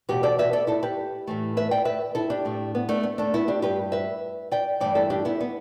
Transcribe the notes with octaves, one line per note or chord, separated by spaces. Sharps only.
E2 B2 A3 G4 B4
A4 D5
B4 E5
A4 D5
E4 A4
G4 B4
A2 E3 A3
B4 E5
D5 G5
B4 E5
E4 A4
D4 G4
A2 A3
B3
A3 D4
B3
A3 D4
B3 E4
D4 G4
G2 G3 G4 B4
B4 E5
D5 G5
G2 E3 A3 D5 G5
E4 A4
D4 G4
B3 E4
B3